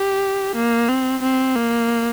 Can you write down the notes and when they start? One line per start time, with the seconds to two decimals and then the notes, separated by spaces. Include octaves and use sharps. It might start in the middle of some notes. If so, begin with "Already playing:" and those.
Already playing: G4
0.55 A#3
0.89 C4
1.22 C4
1.56 A#3